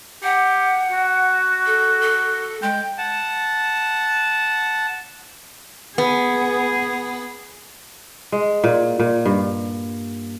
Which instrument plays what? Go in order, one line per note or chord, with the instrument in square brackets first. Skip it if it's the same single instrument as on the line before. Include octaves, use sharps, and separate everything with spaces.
[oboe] G4 [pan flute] F#5
[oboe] F#4
[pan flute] A4
A4
[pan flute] G#3 [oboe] G5
[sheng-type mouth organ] F#5 A5
[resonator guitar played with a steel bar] B3 [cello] G#4
[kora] G#3
A#2
A#2
G2